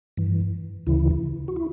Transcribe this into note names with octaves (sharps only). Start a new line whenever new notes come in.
G2 E3
D2 C#3 E3 E4
F#4
E4